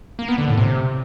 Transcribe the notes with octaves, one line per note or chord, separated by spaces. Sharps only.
A#3
B3
D3
A2
C3